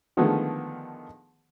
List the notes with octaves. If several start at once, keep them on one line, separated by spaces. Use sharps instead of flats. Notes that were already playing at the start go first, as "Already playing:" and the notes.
D3 D#3 F3 G#3 A3 B3